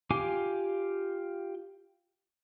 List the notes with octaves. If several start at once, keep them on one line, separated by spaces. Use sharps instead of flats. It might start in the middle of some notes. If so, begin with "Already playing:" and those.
F4 G4 F5 G#5 D6